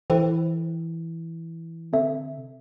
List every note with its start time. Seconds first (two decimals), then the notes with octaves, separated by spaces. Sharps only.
0.10 E3 E4 A4 C5 G5
1.93 D3 C4 A4 E5
2.38 C3